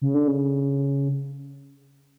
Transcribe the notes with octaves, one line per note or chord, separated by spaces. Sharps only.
C#3
D3
C#3